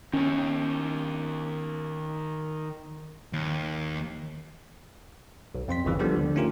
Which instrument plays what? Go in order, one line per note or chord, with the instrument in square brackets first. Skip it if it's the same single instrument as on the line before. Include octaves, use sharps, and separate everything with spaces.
[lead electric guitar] D#3 C#5 [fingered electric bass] C#4
[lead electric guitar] D#2
[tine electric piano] B1
F2 C4 C6 B6
G1 D#2 C#3 E3
F3 G3 B3 D4 G4 A4
D2 D3
A3 C#4 D#4 F4 G4 A#4